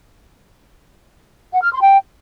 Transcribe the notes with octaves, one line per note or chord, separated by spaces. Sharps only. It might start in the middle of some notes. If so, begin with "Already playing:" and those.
F#5
F6
C6
G5